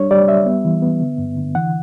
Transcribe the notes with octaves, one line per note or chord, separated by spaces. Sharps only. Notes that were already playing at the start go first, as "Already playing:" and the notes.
Already playing: G3 D4 C#5
G3 D5
G3 E5
B3
E3
B3
D3
G2
D3
E3 F#5